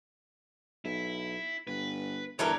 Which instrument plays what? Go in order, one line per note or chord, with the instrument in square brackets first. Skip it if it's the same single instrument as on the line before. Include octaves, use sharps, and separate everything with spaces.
[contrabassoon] B1 [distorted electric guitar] E4
[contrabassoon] G1 [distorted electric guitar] B4
[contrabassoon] G1 [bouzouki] E3 A4 A#4 [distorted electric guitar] C#5 D5